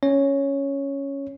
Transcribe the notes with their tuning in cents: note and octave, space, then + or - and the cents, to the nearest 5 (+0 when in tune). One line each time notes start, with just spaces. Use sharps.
C#4 +0 C#5 +0